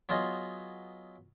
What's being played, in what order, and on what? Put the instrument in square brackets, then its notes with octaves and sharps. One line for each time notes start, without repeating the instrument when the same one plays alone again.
[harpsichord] F#3 B3 F4 G#4 D#5